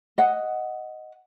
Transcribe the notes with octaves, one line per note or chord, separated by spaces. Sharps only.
D#5 F#5